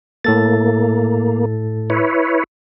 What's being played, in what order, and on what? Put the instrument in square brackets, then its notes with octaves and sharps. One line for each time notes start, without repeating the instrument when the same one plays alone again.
[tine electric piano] A2 A4 A6 [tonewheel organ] A#3
[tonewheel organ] E4 B4 C#5